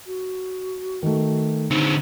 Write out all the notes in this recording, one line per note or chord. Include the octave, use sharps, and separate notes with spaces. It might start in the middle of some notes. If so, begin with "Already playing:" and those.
F#4
D#3 A3
D3 C4 D#4